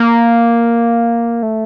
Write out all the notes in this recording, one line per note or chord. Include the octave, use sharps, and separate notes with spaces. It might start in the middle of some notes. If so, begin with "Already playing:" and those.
Already playing: A#3
A3